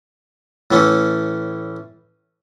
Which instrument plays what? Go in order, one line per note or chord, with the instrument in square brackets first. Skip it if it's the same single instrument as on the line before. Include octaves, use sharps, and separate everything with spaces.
[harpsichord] A2 E3 A3 C#4